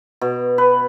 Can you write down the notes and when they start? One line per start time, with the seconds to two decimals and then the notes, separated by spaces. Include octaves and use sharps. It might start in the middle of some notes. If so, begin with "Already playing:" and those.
0.21 B2
0.58 B4